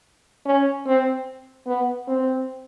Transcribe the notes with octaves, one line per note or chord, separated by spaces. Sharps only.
C#4
C4
B3
C4